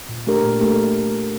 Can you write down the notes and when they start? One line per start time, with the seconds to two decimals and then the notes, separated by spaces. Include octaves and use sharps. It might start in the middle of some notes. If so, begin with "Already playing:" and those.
0.09 A#2
0.27 A3 D4 G4 A#4
0.43 A#2
0.60 A3 D4 G4 A#4